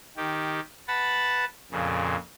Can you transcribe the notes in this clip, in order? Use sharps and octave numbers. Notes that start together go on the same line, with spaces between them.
D#3 G4
B4 F#5 A5 B5 A6
F2 A#2 C#3